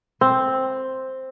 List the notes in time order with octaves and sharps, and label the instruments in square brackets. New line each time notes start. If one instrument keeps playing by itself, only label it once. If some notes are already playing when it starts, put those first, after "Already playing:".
[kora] C4